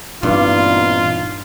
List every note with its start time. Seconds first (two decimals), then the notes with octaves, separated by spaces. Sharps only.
0.23 G2 A#2 E3 B3 C4 D#4 F4